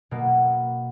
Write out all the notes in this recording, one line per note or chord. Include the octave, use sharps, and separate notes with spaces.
B2 A#3